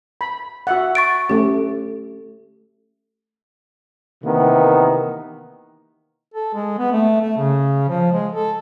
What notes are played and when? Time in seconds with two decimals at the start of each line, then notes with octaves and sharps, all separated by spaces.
0.21 B5
0.67 F#4 E5 F#5
0.95 C#6 A6 D7
1.29 A3 C#4 G4
4.24 C3 D#3 E3 A#3 B3
6.34 A4
6.54 G#3
6.79 B3
6.92 A3
7.21 A3
7.37 C#3
7.88 F3
8.12 G#3
8.32 A4